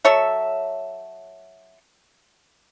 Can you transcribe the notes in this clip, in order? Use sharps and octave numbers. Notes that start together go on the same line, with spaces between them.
F#3 A4 C#5 E5